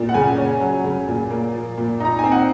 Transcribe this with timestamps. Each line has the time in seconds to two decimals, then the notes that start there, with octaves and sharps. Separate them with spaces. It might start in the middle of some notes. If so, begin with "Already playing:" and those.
Already playing: A#2
0.09 F#5
0.14 C#3 G#5
0.38 C#4
0.61 F#3
0.84 C#3
1.08 A#2
1.31 A#3
1.54 F3
1.78 A#2
2.00 D#4 A#5
2.19 C4 G#5
2.32 F#5